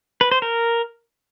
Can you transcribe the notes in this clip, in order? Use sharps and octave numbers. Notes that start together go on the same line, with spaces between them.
B4
C5
A#4